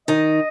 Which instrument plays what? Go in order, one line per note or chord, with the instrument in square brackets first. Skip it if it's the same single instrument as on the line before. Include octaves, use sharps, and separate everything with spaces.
[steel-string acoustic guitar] D#3 D#4 [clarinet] D#5